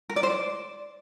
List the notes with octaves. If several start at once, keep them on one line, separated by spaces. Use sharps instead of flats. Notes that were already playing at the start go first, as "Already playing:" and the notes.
A#4
D5
C5
D5